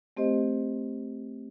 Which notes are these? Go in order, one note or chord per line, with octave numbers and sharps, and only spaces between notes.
A3 C4 G4 C5 D#5